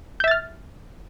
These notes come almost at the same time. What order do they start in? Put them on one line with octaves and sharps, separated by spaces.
G6 E5 A6 F6